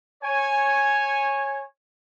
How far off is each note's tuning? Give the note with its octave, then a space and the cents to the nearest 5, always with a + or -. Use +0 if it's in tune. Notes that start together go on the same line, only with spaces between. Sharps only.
C#5 -15 G#5 +0